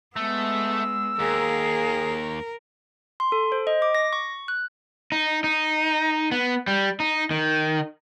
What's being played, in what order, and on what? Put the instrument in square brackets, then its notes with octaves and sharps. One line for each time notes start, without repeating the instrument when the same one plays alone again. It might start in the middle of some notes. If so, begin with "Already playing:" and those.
[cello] G#3 B3 [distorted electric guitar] A3 [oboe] E6
[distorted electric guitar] D#2 [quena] G#4 [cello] A#4
[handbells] C6
A4
C5
D#5
D6
A#6
C#6
F#6
[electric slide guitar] D#4
D#4
B3
G3
D#4
D#3